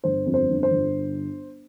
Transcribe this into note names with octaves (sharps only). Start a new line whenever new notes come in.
G1 C5
F2
C5
G1
C5
G1